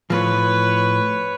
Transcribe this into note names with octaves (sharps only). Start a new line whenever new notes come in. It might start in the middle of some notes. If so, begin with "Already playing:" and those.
A2 F3 B4 C#5